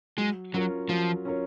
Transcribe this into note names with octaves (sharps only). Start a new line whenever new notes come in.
F#3 G#3
F#3 C#4 F4 A#4 C#5
F3 F#3
C#4 F4 A#4 C#5